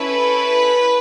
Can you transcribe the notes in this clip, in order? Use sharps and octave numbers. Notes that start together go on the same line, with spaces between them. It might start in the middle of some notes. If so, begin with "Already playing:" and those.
Already playing: C#4 E4 A4 B4